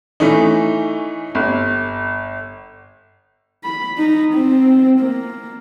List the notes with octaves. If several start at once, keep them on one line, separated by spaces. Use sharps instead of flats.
E3 A3 C#4 D#4
G1
B5
D#4
C4
A#3